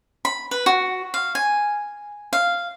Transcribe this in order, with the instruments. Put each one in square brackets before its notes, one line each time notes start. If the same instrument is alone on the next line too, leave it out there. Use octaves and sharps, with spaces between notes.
[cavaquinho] B5
B4
F#4
F5
G#5
F5